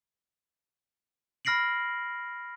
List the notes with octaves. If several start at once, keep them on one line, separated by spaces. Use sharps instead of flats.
B5 F6 A#6 C7 D7 F#7